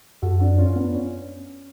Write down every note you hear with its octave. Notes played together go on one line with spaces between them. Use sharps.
F#2 F#4 A4
D4 F#4
C#4 F4
B3 D4
C#4